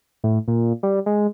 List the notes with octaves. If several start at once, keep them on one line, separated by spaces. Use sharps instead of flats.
A2
A#2
G3
G#3